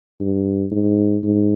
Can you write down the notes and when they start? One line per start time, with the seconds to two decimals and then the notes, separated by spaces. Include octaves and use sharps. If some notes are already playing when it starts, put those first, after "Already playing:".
0.20 G2
0.71 G#2
1.23 G#2